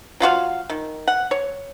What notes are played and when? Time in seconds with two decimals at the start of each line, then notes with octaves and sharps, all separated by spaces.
0.20 F#3 F4 F#4 F5
0.70 D#3
1.08 F#5
1.31 C#5